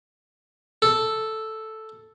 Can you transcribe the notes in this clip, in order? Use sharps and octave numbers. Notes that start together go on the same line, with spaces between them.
A4